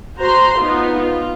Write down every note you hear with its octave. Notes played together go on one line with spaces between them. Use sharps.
F#4 C5 A#5 C6
B3 D#4 F4
F4